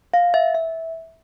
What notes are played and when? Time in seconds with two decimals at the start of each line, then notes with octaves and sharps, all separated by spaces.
0.14 F5
0.34 E5
0.55 E5